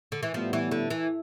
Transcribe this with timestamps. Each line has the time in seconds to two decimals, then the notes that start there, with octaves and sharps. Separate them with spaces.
0.12 D3
0.23 E3
0.34 A2 F3 G3 B3
0.53 E3
0.71 D3
0.90 E3